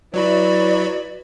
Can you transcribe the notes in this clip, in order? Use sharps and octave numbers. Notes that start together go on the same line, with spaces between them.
F#3 E4 F#4 B4 D5 B5